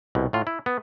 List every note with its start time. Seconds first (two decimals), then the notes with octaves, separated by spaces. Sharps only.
0.15 C2 B2
0.33 A2 F4
0.47 E4
0.66 B3